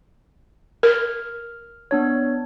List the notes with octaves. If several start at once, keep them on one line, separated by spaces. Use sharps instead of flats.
A#4 F6
B3 D4 C#5